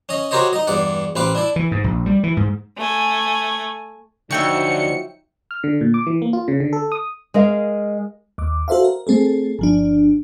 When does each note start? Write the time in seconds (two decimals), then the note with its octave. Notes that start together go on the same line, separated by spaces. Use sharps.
0.09 C#4 D#5
0.31 F#4 G4 A#4 C5 C#5 D#5
0.53 D#4 D#5
0.67 E2 G2 D5 F#5
1.16 A1 C4 B4 F5 D6
1.35 D4 E4 D5
1.56 E3
1.71 G#2
1.84 A#1
2.06 G3
2.23 E3
2.37 G#2
2.77 A3 G#5
4.31 D2 F3 F#3 D#4 E5 G5 C#6 C#7
5.51 F6
5.64 D3
5.81 A#2
5.94 D6
6.07 E3
6.22 A#3
6.33 F4
6.48 C#3
6.60 D3
6.73 A4
6.92 D#6
7.34 G#3 A#4 D#5 F5
8.38 D#2 D6
8.68 F#4 A4 C5 E5 F5
8.84 A#4
9.07 A3 C4 G#4 A4
9.59 G1 F3 D4